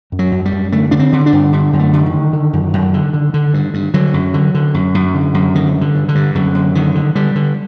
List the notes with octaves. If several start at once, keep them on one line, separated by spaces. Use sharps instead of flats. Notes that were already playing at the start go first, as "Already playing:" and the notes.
F#2
F#3
F#2
G3
F#2
D3 A3
D3 D4
C4
D3
D4
G2
D3
F#2
A3
D3
D#3
D3
D3
F#2
F#2
D3
D3
D3
G2
G2
D3 F#3
F#2
D3
D3
F#2
F#2
D3
F#2
D3 D#3
G2
D3
G2
D3
G2
F#2 D3
F#2
D3 D#3
D3
D3 G3
D3